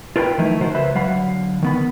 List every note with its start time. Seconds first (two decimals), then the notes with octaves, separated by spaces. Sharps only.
0.16 F4 A#4 B4 C#5 G5 B5
0.38 D#3 F3 F#3 A3 D#4 E4
0.61 D#3 F3 F#4 A#4 C5
0.75 C#2 B4 C5 E5 B5
0.95 D3 F#3 F5 F#5 B5
1.62 D#3 B3 B5